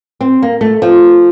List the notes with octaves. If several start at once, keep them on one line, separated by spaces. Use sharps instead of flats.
C4
A#3
A3
F3